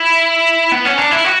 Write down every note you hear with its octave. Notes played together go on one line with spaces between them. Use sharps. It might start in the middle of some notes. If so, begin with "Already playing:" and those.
Already playing: E4
B3
C#4
D4
E4
F#4